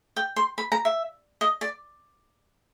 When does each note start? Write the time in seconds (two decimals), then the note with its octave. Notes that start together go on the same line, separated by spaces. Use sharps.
0.16 G5
0.36 C6
0.58 B5
0.72 A#5
0.85 E5
1.41 D#5
1.61 D5